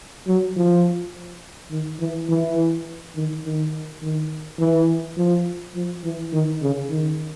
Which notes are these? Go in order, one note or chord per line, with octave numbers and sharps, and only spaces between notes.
F#3
F3
D#3
E3
E3
D#3
D#3
D#3
E3
F3
F3
E3
D#3
C#3
D#3